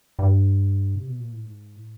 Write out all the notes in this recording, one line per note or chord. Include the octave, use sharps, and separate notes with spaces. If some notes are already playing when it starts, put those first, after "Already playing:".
G2
C3
B2
A#2
A2
G#2
A2